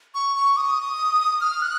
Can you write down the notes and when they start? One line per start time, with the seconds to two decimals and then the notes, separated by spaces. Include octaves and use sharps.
0.15 C#6
0.36 C#6
0.57 D#6
1.41 F6
1.62 F#6